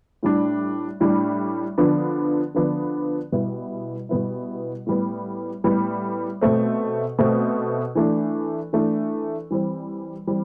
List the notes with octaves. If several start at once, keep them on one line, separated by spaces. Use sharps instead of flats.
A2 G3 D4
A2 G3 D4
D3 F3 B3 D4
D3 F3 B3 D4
B2 G3 B3 E4
B2 G3 B3 E4
A2 G3 B3
A2 G3 B3
B2 A3 C4
B2 A3 C4
E3 A3 D4
E3 A3 D4
E3 G3 C4
E3 G3 C4